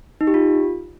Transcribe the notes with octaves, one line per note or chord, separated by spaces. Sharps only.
D#4
G4
F4